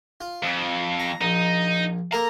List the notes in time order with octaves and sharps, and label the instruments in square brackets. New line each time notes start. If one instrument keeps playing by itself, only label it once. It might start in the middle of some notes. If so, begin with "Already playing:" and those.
[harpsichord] F4
[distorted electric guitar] F2
[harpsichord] A#5
[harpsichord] A#1 [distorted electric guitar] D#4
[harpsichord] A#3 A4 A#4 [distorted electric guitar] A#5